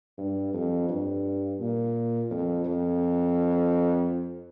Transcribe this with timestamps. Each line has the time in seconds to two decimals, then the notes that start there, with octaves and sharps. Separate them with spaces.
0.18 G2
0.53 F2
0.89 G2
1.60 A#2
2.31 F2
2.65 F2